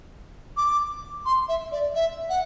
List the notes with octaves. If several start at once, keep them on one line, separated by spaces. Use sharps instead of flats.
D6
C6
E5
D5
E5
F#5